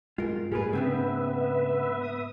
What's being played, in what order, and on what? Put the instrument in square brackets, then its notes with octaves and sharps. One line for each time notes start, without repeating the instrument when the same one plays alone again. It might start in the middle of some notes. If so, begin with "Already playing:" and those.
[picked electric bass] G2 G#3 [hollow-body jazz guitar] F4 A#4
[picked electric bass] G#2 A#3 [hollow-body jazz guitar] G3 A#4 B4 [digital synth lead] G#4
[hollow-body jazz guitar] C#3 C4 D4 [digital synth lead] B3 [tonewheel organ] B4 E5
[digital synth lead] D#6